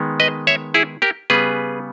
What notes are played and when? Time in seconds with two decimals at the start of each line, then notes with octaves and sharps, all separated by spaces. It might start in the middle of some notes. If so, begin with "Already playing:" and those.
Already playing: D#3 G#3 B3
0.20 B4 D#5
0.47 C#5 E5
0.74 E4 G#4
1.02 G4 A#4
1.30 C#3 G3 B3 G#4 B4